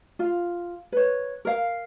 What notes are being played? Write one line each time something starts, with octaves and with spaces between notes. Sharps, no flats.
F4
B4 C#5
A#4 F5